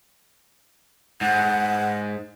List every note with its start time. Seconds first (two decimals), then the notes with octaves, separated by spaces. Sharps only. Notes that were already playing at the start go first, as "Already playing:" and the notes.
1.21 G#2 F#5